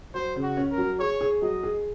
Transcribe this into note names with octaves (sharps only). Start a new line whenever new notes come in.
F#3 C5
C#3
F#4
C#4
A#4
F#3
G#4 C#5
G#4
F#3 D#5
G#4